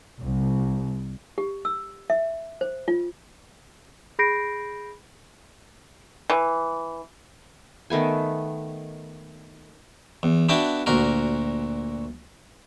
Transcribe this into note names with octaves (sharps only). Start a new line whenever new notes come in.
C2
G4
E6
E5
C5
F4
G#4 B5 G6 A#6 C7 D7
E3
D#3 A3 B3 G#5
E2
B3 D4 E4 F#4 G5 A5
D2 A#2 F#4 A#4